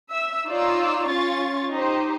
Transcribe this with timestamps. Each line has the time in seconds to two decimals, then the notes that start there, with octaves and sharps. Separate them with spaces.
0.11 E5 E6
0.46 D#4 F4 C#5 D5 E6
1.05 C#4 F4 C#6 A6
1.71 D#4 G4 C5